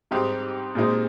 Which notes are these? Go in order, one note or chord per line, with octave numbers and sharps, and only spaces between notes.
G#2 G3 C4 D#4 G4
A#2 G#3 C4 D#4